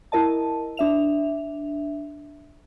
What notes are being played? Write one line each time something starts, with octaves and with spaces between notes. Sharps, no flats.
E4 A#4 D#5 A5
D4 E5 F7